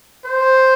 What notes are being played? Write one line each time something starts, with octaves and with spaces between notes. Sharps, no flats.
C5